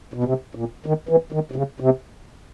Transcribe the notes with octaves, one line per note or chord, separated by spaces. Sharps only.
B2
C3
A#2
D#3
E3
D#3
C3
C#3
C3